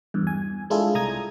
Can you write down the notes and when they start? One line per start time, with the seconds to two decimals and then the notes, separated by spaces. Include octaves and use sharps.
0.14 E2 G2
0.27 G#5
0.70 G#3 D4 E4 F4 G#4 A4
0.95 C2 A#5 D#6 G#6